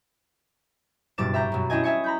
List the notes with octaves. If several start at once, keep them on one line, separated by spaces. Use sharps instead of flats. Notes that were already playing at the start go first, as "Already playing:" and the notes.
F#1 G2 B2 D6 A6 E7
E5 G5 A#5 C#6
F#2 B2
C#4 D4 E4 D#5 G5 G#5
D#5 E5 G#5 C#7
A#5 B5 G6